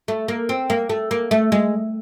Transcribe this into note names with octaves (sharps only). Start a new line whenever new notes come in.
A3
A#3
C4
A#3
A3
A#3
A3
G#3